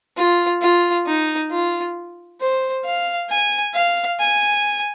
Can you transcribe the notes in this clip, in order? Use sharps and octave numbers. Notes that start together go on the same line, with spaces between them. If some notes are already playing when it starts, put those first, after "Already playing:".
F4
F4
D#4
F4
C5
F5
G#5
F5
G#5